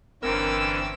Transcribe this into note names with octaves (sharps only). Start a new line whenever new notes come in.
G1 D3 E3 C4 C#4 A#4 D6 E6